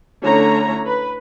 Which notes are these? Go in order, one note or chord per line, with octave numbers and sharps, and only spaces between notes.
D3 A3 C#4 E4 C#5 A#5
B4